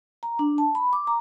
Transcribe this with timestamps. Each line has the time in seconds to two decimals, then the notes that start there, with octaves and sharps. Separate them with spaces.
0.23 A#5
0.39 D4
0.58 A5
0.75 B5
0.93 D6
1.07 A#5